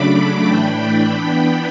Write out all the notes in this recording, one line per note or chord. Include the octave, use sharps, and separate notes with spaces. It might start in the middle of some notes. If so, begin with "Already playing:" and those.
Already playing: C#3 F#3 A3 D4 B5 D6
A2 E3 A3 D4 G5 B5
E3 B3 D4